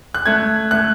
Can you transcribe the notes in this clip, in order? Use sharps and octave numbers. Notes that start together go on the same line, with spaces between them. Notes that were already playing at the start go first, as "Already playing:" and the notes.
F#6
A3 G#6
A3 F#6